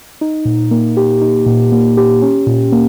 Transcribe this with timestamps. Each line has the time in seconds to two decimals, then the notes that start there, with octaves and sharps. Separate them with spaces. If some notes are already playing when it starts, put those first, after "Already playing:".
0.21 D#4
0.45 A#2
0.71 A#3
0.97 G4
1.21 D#4
1.46 A#2
1.72 A#3
1.97 G4
2.22 C#4
2.47 A#2
2.72 A#3